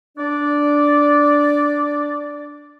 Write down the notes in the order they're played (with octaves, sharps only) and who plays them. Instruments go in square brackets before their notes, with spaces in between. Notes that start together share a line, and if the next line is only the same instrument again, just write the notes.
[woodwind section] D4 D5